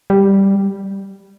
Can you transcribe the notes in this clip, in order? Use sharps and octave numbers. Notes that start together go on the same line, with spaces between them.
G3